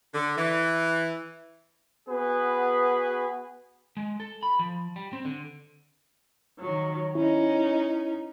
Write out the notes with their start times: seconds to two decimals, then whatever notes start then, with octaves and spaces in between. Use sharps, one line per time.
0.14 D3
0.36 E3
2.08 B3 F#4 G#4 B4
3.97 G#3
4.20 A4
4.43 B5
4.59 F3
4.96 G3
5.13 C4
5.25 D3
6.59 D#3 F#3
7.15 C#4 D#4 E4